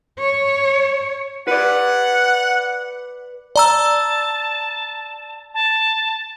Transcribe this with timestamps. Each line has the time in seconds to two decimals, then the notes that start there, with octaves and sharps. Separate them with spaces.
0.19 C#5
1.48 B4 D5 F#5
3.56 D5 A5 A#5 E6
5.54 A5